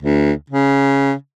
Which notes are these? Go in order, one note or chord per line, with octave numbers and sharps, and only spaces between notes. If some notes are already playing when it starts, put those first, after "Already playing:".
D2
C#3